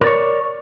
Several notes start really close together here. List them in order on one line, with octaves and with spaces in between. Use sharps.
A#4 D5 C#5